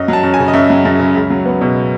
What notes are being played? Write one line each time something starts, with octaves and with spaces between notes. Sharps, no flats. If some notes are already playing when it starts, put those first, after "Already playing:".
Already playing: F#2 D#5
F#3 A5
F#2
G#5
C#3
D#5
F#2 E5
F#3
F#2
C#3
C#2
F#3
B3
B2